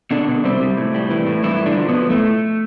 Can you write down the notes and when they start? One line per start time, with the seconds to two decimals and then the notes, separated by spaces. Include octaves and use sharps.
0.11 B2 D3 D4
0.28 B2
0.44 C3 G3 C4
0.60 G3
0.77 A2
0.94 G3
1.10 E3
1.27 A2
1.43 G2 E3 E4
1.60 G2
1.66 D3 D4
1.76 F3
1.88 B2 B3
1.94 F3
2.10 A2 A3